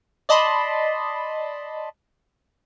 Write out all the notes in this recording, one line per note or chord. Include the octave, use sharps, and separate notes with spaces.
D5 D#5 A5 B5 C6